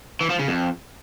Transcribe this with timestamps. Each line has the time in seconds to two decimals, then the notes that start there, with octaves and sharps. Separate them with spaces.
0.21 E3
0.30 F3
0.39 C#3
0.48 F2